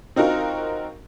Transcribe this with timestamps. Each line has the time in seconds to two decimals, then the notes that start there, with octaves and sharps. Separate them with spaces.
0.16 C4 D#4 F4 F#4 A#4